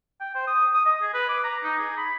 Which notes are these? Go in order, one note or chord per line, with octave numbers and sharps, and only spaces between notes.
G5
C5
D#6
D#6
D#5
G#4
B4
D6
A#5
D#4
G#4
B5